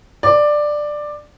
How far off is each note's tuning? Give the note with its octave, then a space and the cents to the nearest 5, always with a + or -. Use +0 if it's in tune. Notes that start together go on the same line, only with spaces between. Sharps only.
D5 +10